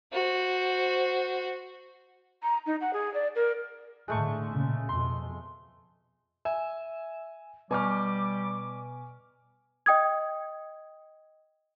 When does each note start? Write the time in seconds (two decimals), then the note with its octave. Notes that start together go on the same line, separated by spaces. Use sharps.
0.13 F#4 C5
2.43 A#5
2.66 D#4
2.81 F#5
2.93 G#4
3.14 D5
3.35 A#4
4.08 A2 D3 G#3 A3 C#6
4.53 A#2 C#3
4.89 F2 B2 C6
6.45 E5 G#5
7.71 B2 G3 G#5 C#6 D6 F6
9.86 D#5 G5 D#6 G#6